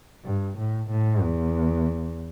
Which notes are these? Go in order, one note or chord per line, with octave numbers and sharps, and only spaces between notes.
G2
A2
A2
E2